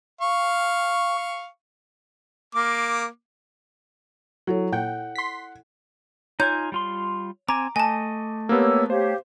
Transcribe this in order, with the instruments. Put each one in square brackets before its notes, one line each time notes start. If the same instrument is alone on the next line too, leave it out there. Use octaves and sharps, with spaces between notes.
[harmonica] F5 C#6
A#3 D6
[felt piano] F#3 [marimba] E4 A4 C#5
[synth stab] A#2 G5 [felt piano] F#5
[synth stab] C6 B6
[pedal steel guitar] D#4 F4 G#5 [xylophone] C#5 G6
[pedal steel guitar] G3 F4 C6
[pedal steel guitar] C4 G#5 [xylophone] A#5 [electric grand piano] D6
[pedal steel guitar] A3 D#5 [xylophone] G#5 A5
[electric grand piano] A#3 B3 [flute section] G4 C#5 E6
[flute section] G4 C#5 F5 [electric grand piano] C5